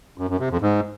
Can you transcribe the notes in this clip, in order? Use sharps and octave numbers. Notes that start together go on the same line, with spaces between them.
F#2
F#2
C3
F2
G#2